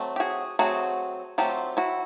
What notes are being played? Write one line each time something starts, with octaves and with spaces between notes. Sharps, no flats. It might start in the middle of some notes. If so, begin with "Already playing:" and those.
Already playing: F#3 A3 C4
G4
F#4 G#4
F#3 A3 C4 F#4 G#4
F#3 A3 C4 F4 G4
E4 F#4